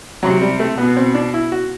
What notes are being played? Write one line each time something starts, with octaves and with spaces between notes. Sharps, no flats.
C3 F#3
G3
A3
B2 B3
C4
D4
E4
F#4